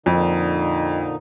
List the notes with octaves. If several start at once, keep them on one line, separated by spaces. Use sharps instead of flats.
F2 A#2 D3 D#4